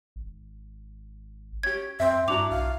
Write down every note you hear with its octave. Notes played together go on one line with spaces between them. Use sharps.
G#1
C#4 G4 G#6
F#2 C4 E5
G2 D4 E4 F#4 A#5 D6 F7
B1 F5